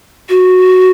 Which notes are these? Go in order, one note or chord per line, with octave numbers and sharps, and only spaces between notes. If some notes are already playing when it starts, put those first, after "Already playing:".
F#4